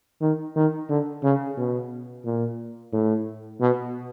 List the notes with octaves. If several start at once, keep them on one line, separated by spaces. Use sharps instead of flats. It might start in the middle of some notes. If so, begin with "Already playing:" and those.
D#3
D#3
D3
C#3
B2
A#2
A2
B2